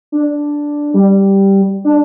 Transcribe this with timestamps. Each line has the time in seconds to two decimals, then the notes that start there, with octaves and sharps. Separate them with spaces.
0.12 D4
0.94 G3
1.84 D4